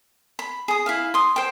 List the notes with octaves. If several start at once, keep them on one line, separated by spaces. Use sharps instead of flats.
B5
G#4 D#6
E4 E5 F5
C6 D#6
C5 G5